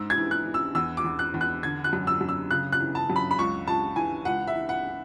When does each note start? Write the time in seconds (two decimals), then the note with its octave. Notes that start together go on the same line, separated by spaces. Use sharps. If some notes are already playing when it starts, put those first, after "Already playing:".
Already playing: G#2 E6
0.10 G#6
0.18 E3
0.31 F#6
0.46 E3
0.54 E6
0.75 E2 E6
0.97 D6
1.04 E2
1.19 F#6
1.34 E2
1.41 F#6
1.63 D3 G#6
1.84 F#6
1.93 F#2
2.07 E6
2.21 F#2
2.29 E6
2.51 C#3 F#6
2.72 F#6
2.80 E3
2.95 A5
3.10 F#2
3.16 B5
3.31 B5
3.38 C#2 C#6
3.67 C#2 A5
3.96 E3 G#5
4.25 C#2 F#5
4.47 E5
4.56 E3
4.69 F#5